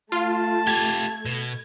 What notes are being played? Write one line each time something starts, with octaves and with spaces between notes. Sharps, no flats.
A3 F4 A5
F4 G4 G#6
B2